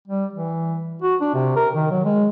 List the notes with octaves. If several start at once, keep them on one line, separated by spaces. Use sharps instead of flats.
G3
E3
F#4
D4
C3
A#4
D#3
F#3
G#3